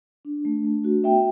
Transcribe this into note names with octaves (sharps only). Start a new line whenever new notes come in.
D4
A3
A3
F#4
B3 E5 G5